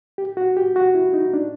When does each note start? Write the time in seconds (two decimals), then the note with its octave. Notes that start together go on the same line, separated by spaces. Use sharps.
0.18 G4
0.37 F#4
0.57 G4
0.76 F#4
0.95 E4
1.14 D#4
1.34 D4